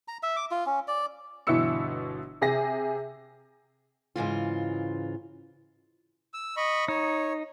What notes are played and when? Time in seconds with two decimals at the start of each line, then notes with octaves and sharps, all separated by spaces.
0.08 A#5
0.23 E5
0.36 D6
0.51 F4
0.66 C#4
0.88 D5
1.47 G1 B2 E3 E4 E6 C#7
2.41 C3 G#4 A#6
4.16 G#2 C#3 E3 F4
6.34 E6
6.57 D#5 B5 C#6
6.88 D#4 C#5